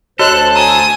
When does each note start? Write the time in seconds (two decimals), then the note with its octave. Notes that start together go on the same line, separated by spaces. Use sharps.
0.19 D2 F#4 A4 C5 C#5 D#5 F#6
0.55 G#5 A#5 D#6